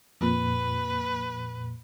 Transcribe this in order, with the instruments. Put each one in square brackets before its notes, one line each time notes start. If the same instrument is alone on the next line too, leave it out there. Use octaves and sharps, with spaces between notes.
[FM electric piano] F2 A#2 [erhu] B4